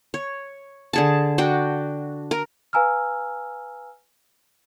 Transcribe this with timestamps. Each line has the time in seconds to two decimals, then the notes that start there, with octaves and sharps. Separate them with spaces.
0.14 C#5
0.93 D3 G#4 A5
1.38 D4 F#4 G5
2.31 A#4
2.73 B4 F5 G#5 A#5 E6 F6